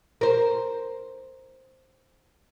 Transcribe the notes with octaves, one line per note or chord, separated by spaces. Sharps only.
A#4 C5